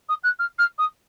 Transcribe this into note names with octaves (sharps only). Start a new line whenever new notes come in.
D#6
F#6
F6
F6
D#6